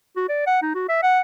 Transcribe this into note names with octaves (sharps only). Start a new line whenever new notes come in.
F#4
D5
F#5
D#4
F#4
E5
F#5